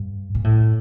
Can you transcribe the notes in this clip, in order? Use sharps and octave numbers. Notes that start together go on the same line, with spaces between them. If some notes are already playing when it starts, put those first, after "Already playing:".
Already playing: G2
A#2
A2